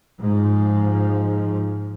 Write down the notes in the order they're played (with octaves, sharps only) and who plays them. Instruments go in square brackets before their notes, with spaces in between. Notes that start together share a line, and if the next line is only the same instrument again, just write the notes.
[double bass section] G#2 F3